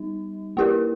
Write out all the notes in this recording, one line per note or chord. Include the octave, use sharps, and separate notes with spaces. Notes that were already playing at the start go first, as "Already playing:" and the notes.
Already playing: G3 D#4
A#3 E4 G4 A#4